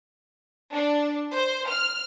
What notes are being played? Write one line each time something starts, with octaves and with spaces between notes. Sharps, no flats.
D4
C5
F6